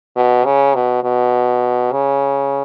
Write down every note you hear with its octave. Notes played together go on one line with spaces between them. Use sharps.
B2
C#3
B2
B2
C#3